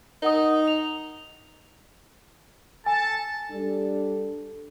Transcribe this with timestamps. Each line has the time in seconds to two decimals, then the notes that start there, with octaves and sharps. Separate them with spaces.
0.22 D#4 A#4 F#5 D#6
0.67 F7
2.86 A4 G#5 A5
3.51 G3 D4 A4